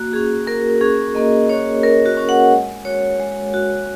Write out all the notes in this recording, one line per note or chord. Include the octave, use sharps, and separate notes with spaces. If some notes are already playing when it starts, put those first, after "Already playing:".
Already playing: A#3 F#4
C#4 F#4 G#4
A#3 A#4
C#4 F#4 G#4
A#3 D#5
C#4 F#4 C#5
A#3 A#4
F#4
C#4 F#4
F#5
G#3
F#4 C#5
G#3
F#4